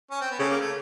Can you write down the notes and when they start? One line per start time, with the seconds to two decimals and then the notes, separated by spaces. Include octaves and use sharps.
0.11 C#4
0.21 C4
0.31 B3
0.40 C#3 A3
0.49 A#3
0.60 A3